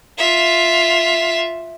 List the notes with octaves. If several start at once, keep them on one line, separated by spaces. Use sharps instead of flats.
F4 E5